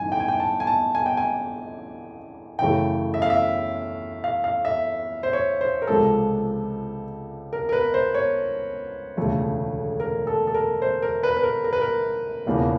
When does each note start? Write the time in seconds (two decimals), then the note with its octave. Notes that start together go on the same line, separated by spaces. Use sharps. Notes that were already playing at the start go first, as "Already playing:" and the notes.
Already playing: A1 G2 D#3 G#5
0.12 G5
0.20 G#5
0.28 G5
0.40 A5
0.60 G#5
0.67 A5
0.95 G#5
1.06 G5
1.17 G#5
2.59 F#2 C#3 E3 A3 G5
3.14 E5
3.22 F5
3.30 E5
4.24 F5
4.44 F5
4.65 E5
5.23 C5
5.33 C#5
5.61 C5
5.82 A#4
5.87 C#2 C3 F3 G#3 C4 A4
7.53 A#4
7.69 A#4
7.73 B4
7.94 C5
8.15 C#5
9.17 E1 D2 C#3 F3 A3
10.00 A#4
10.27 A4
10.47 A4
10.54 A#4
10.82 C5
11.02 A#4
11.23 B4
11.37 B4
11.43 A#4
11.64 A#4
11.73 B4
11.81 A#4
12.46 E1 E2 C#3 F3 A#3